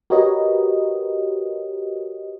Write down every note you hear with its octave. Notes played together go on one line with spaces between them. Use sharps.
F#4 G4 A#4 B4 C#5 D#5